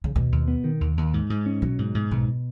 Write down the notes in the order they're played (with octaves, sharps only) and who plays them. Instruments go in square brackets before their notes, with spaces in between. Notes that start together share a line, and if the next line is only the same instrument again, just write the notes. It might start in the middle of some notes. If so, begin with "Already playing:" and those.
[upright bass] C#3
[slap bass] D#2 [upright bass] B2
[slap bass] D#2
B3
D#3
D#2
D#2
G#2
G#2
C#4
[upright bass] B2 [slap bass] F#3
[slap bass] G#2
G#2
[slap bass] B1 [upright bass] B2